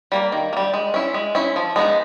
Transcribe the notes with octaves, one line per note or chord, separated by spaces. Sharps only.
G3 A#3
D#3
A#3
G3
G#3
C#4 E4
G#3
C#4 E4
F3
G#3 B3 D#4